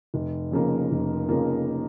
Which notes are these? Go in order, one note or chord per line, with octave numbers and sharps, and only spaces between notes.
F1
F2 C#3 F3 A#3
F1
F2 C#3 F3 A#3